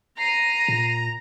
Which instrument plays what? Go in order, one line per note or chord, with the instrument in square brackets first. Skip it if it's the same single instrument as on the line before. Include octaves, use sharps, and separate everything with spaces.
[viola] A#5 [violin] C7 D#7
[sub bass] A#2